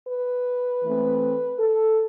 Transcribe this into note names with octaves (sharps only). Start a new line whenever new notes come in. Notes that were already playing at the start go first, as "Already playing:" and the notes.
B4
E3 A3 C4
A4